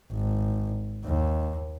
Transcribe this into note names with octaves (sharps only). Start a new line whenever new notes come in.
G#1
D#2